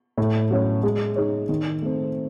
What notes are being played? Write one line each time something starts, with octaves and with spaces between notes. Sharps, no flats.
A2
F#3 C#4 F#4 C#5
G#3
D#4 G#4 C#5
D#3
A3 C4